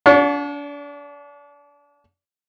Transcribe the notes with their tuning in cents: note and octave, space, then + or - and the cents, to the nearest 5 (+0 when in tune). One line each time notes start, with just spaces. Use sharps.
D4 -35 C#5 +30 F#5 -45